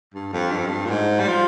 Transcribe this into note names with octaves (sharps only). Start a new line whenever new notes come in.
G2
F2
G2
F2
G2
A#2
G#2
G3
F3